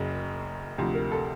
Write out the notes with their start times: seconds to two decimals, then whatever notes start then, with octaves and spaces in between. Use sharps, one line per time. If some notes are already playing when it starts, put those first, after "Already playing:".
Already playing: F#1 F#2 C#3
0.78 D2 C3 F3
0.95 A#4
1.12 A4